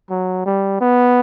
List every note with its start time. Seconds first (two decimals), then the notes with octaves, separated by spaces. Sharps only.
0.10 F#3
0.46 G3
0.81 B3